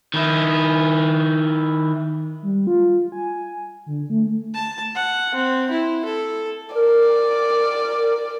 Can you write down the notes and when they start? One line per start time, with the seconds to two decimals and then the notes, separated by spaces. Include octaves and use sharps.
0.14 D#3 E4
2.42 G3
2.67 F4
3.12 G#5
3.86 D3
4.10 A3
4.54 A5
4.95 F#5
5.35 C4
5.71 E4
6.05 A4
6.75 A#4 D5